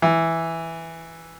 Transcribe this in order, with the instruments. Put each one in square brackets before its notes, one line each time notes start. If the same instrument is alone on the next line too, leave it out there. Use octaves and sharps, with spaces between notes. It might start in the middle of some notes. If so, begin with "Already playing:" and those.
[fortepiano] E3